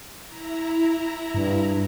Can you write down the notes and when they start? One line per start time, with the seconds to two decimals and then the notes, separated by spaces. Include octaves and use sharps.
0.24 E4 A#5
1.35 G2